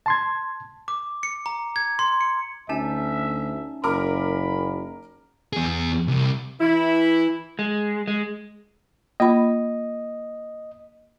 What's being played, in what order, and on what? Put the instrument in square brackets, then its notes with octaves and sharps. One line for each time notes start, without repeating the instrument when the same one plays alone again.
[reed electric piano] A5 C6 G#6
[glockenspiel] D6
C#7
A#5
G#6
C6
C#7
[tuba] D2 [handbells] C#4 D#4 A5 [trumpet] E5
[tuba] F#1 [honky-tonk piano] A#4 D6 F6 [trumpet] B5
[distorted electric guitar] E2 G#4
C2
[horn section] E3 E4
[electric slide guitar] G#3
G#3
[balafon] A#3 F4 B5 [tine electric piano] D#5